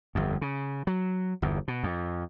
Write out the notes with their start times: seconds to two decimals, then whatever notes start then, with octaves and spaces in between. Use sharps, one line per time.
0.15 G1 F2
0.41 C#3
0.87 F#3
1.42 G1 E2
1.68 B2
1.84 F2